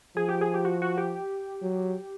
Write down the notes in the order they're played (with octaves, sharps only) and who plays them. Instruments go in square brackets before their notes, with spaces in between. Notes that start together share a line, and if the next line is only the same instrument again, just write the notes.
[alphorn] F3 [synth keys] G#4
[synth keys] G4
G#4
G4
F#4
F#4
G4
[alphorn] F#3